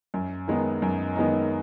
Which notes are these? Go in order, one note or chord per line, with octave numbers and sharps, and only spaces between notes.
F#2
D#3 G#3 B3 D#4
F#2
D#3 G#3 B3 D#4